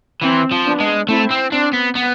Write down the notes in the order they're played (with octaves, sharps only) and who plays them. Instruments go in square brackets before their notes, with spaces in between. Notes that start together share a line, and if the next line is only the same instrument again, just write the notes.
[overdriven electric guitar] E3 [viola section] C4
[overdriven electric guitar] F3
[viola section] B3 D4
[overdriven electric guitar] G#3
[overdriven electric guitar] A3 [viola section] C4 E4
[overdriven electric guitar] C4
[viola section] C4 [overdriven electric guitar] D4
[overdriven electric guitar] B3
B3